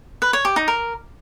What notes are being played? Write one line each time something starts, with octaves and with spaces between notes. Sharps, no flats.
B4
C#5
G4
D#4
A#4